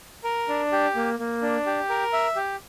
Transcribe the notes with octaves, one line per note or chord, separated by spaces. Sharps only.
A#4
D4
G4
A#3
A#3
D4
G4
A#4
E5
G4